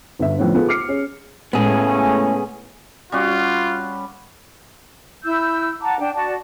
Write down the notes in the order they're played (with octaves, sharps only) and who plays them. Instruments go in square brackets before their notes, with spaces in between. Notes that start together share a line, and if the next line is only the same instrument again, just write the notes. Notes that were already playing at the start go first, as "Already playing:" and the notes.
[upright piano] G1 D3 E5
F2 A2 D3 B3 C#4
B3 F4 G#4 A4
D6 F6 C7 C#7
C#4 G#4
[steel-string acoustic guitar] A2 G#3 [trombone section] C#3 A3 C#4 [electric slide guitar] B3 G#4
[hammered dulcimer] G3 C#4 F#4 [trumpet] F4
[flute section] E4 E6 G6
F#5 A5 A#5 D6
D4 G5
F#4 D5 A5